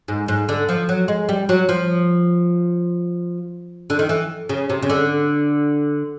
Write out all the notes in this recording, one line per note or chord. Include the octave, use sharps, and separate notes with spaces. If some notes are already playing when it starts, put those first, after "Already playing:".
G#2
G#2
D3
F3
F#3
G#3
G3
F#3
F3
D3
D#3
E3
C#3
C3
C#3
D3